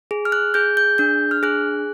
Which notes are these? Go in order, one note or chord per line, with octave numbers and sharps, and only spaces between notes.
G#4
F6
F#6
G#4 G6
G6
D4 G6
F6
G#4 F#6